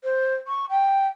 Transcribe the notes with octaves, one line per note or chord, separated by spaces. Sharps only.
C5
C#6
G5